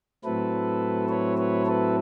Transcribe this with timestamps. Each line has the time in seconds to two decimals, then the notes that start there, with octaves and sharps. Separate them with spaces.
0.24 A2 F#3 A3 C4 E4 A4 B4
1.09 B4 C#5
1.37 B4 C#5
1.66 A4 B4